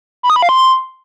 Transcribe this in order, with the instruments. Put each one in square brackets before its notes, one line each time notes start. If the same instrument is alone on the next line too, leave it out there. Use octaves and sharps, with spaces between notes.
[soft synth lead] B5
D#6
B5
F5
C6